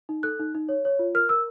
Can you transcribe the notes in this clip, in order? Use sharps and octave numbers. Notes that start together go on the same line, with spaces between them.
D#4
A4 F#6
D#4
D#4
C#5
C#5
F4
A#4 F6
A#4 E6